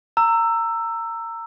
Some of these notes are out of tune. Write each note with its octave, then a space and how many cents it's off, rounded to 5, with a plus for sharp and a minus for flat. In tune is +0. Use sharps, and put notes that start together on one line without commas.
A#5 -20 E6 +10